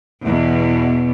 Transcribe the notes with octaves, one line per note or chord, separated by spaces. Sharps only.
E2 B2